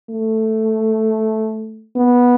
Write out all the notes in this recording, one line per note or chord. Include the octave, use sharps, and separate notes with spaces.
A3
B3